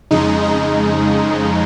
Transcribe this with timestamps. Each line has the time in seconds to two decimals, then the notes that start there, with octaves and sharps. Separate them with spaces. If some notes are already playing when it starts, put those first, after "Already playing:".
0.11 F2 C#3 G#3 D#4
0.44 D#4